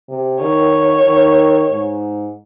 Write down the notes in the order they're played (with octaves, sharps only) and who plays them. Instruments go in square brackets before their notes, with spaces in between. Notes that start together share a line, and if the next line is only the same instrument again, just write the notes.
[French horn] C3
[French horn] D#3 [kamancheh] C#5
[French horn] D#3
G#2